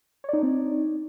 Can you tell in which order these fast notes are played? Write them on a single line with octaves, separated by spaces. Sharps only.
C#5 D5 D#4 D4 C4